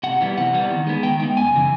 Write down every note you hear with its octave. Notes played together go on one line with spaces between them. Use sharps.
C3 F#5
E3 G3 B3
C3 F#5
E3 G3 B3
D#3
G#3 B3
D#3 G5
G#3 B3 G5
F#2 G#5
C#3 E3